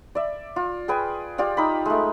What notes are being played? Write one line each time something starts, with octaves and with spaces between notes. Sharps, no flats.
D5 E5
F4
G#4 B4 G5 G#5
F4 G4 D5 F5
D#4 B5
G#3 A3